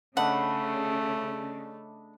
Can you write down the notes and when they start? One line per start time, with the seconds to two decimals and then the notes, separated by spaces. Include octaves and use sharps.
0.17 C#3 A3 D4 D#5 F#5 B5